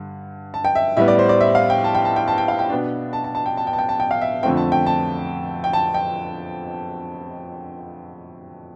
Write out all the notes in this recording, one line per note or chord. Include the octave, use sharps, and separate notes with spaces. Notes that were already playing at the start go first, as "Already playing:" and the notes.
Already playing: G2 D3
A5
G5
E5
A2 G3 B3 E5
D5
C5
D5
E5
F5
G5
A5
G5
A5
G5
A5
G5
F5
G5
B2 B3 D4
A5
A5
A5
G5
A5
G5
A5
G5
A5
G5
F5
E5
F2 D3 A3 C4 G5
A5
G5
A5
G5
A5
G5